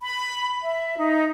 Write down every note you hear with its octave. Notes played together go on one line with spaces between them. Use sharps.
B5
E5
D#4